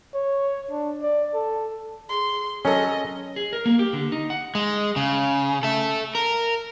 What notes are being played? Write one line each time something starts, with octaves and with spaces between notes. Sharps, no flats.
C#5
D4
D5
A4
G#4 C6
F#3 C#4 A4 D#5
G#4
A#4
A#3
G4
D3
D#4
F#5
G#3
C#3
A4 E5
A#4